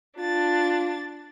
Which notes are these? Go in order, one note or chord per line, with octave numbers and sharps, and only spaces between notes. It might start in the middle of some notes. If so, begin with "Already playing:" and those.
D4 F4 A6